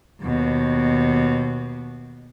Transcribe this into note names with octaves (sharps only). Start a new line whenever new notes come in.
D#2 B2